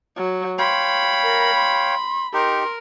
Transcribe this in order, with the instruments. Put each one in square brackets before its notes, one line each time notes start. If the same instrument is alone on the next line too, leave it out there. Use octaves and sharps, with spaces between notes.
[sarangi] F#3
[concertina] C#5 F5 G5 [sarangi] B5 [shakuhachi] C6
[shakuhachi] A#4
C6
[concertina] D#4 G4 [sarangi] A#4 [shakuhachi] C6